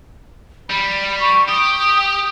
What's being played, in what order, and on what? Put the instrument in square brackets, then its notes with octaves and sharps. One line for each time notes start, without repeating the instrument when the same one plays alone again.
[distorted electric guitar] G3 [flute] B5
[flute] C#6
[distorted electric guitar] G4 [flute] D#6